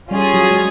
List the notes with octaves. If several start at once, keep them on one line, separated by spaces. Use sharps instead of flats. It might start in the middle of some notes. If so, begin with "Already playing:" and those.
G3 C#4 F4 G#4
F#3
G#3